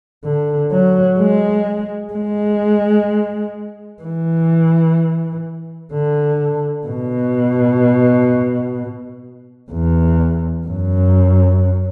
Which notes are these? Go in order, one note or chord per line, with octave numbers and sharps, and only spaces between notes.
D3
F#3
G#3
G#3
E3
D3
B2
E2
F#2